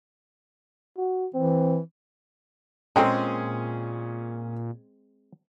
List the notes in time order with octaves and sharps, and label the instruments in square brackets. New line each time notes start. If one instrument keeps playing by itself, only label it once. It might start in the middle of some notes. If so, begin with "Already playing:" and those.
[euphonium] F#4
[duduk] E3 [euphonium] C4
[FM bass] A#2 [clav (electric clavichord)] G#3 C4 [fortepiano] C#4 G#4 [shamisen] A4 G5 A#5